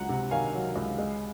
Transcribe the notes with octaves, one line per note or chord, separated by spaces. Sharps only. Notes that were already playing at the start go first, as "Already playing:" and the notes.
Already playing: C#2 F#3 F#5 A#5
C3
D#3 F5 G#5
F#3
C#2
G#3